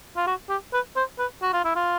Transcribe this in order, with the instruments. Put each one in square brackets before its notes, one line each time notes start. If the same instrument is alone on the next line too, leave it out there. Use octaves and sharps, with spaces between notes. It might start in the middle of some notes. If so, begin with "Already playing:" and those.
[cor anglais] F4
F#4
G4
B4
C5
B4
F#4
F4
E4
F4